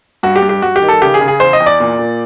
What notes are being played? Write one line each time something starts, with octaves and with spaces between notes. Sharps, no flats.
G2 F#4
G4
G2
G4
G2 F#4
G4
D#3
A4
C#3 G4
G#4
C#3
G#4
E2 C5
D#5
E2
D5
A#2
A#2